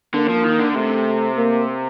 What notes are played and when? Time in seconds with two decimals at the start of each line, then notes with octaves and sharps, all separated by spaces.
0.14 D3 A#3
0.29 F3
0.44 D#3
0.60 D3
0.75 C3 A3
1.37 A#3